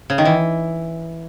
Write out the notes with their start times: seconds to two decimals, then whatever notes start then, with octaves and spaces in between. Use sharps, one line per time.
0.10 C#3
0.18 D#3
0.25 E3